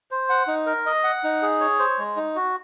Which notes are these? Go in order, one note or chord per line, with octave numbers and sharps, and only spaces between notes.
C5
F#5
D#4
A#4
D#5
F#5
D#4
G#4
C#5
C5
G#3
D#4
F#4